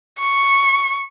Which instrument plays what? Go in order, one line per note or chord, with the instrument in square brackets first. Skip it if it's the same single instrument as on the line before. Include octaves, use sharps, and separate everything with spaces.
[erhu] C#6